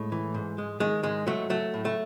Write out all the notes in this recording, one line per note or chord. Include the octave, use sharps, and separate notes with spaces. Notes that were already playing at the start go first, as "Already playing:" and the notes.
Already playing: A2 G#3
E3
G#2
G#3
D#3 G#3
G#2 G#3
F#3 A3
F#3 A3
A2
A3